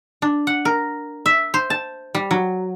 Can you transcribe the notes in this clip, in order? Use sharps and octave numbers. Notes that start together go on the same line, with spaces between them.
D4
F#5
A#4
E5
C5
A5
G3
F#3